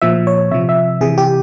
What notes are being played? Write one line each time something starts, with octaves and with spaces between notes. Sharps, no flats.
A#2 F3 E5
C#5
C3 F3 E5
E5
C3 E3 G#4
G4